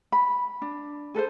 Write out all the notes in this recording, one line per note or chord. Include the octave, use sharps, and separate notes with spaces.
B5
D4
G#4 A4 B4 C5